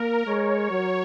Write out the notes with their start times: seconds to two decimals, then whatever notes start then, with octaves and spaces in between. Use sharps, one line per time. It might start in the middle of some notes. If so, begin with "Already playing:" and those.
Already playing: A#3 A#4
0.26 G#3 C#5
0.71 F#3